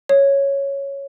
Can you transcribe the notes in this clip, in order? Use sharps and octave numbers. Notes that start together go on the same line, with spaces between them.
C#5